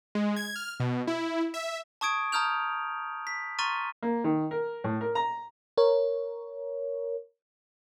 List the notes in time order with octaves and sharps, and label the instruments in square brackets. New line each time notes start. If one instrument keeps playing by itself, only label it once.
[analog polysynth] G#3
G#6
F6
B2
E4
E5
[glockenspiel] A5 C#6 D#6 G#6 D7
A5 A#5 D#6 F6 G6 F7
B6
A#5 C6 C#6 F6 A6 D#7
[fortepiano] A#3
D#3
A#4
A2
A#4
A#5
[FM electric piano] A#4 C#5